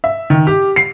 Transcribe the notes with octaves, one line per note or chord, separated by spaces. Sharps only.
E5
D#3
G4
C7